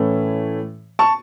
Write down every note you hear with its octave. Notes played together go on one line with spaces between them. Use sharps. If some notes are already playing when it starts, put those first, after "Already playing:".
Already playing: A2 E3 A3 C#4
A5 C#6